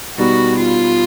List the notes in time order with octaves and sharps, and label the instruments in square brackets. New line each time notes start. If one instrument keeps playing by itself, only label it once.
[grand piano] B2 G3 B3 D#4 [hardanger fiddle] F#4
[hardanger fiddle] F4